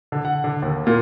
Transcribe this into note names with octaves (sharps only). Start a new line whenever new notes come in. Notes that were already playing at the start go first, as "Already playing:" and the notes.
D3
F#5
D3
D#2
A#2